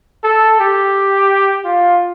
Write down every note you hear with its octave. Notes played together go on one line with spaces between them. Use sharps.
A4
G4
F4